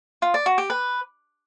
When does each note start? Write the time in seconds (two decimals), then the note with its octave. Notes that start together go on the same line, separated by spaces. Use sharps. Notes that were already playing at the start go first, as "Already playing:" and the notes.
0.22 F4
0.34 D5
0.46 F#4
0.58 G4
0.70 B4